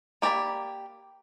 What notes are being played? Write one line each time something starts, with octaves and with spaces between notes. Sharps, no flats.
A#3 G4 D5 A#5 B5